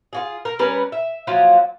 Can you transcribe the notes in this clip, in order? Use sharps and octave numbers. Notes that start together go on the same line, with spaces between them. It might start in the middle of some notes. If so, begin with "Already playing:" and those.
F4 F#4 G#4
A#4
G3 C#4 A#4 B4
E5
F3 F#3 A#3